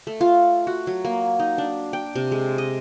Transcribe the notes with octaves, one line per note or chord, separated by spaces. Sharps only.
A3
F4
F#4
F#3
A#3
D#4
D4
G5
C3
G#3
D#5